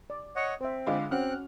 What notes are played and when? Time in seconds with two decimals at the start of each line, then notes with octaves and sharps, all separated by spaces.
0.10 D5
0.36 C#5 D#5 F#5
0.61 C4 C5 E5
0.87 D3 G#3 F4 B5 D6
1.11 C4 C#4 F#4 F#5 F6 F#6